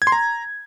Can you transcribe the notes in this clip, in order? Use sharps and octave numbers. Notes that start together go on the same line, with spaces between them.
G#6
C6
A#5